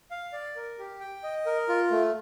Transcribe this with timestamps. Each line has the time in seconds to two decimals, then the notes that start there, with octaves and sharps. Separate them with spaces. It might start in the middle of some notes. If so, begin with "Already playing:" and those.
0.11 F5
0.33 D5
0.56 A#4
0.79 G4
1.00 G5
1.23 D#5
1.46 A#4
1.69 F4
1.91 A3